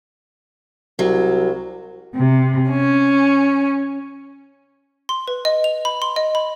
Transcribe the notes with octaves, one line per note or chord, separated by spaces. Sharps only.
C2 F#3
C3
C#4
C6
B4
D#5
F7
B5
C6
D#5
B5